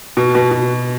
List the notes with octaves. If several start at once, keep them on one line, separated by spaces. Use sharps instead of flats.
B2
B2
B2